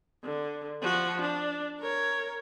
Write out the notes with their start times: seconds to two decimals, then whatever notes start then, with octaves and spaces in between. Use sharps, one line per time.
0.24 D3
0.82 F3 F#4
1.21 D4
1.80 A#4 C#5